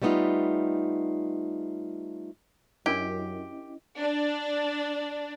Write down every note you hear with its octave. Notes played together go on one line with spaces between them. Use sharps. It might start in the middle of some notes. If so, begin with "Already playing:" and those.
G3 A3 B3 C4 D#4 F4
F#2 C#4 D4 E4 G4 A#4 D#5
D4